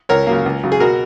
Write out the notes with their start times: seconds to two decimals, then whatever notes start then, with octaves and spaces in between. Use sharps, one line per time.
0.09 C#2 A#4 C#5
0.27 C#3 F#3 A#3
0.46 C#2
0.63 C#3 F#3
0.72 G#4
0.80 B2 F#4 A#4